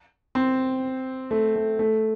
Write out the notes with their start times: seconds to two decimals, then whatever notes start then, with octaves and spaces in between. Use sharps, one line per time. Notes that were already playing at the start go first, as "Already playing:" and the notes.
0.35 C4
1.31 A3
1.56 A3
1.79 A3